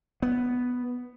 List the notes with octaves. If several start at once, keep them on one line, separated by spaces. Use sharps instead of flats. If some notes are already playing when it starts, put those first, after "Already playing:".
B3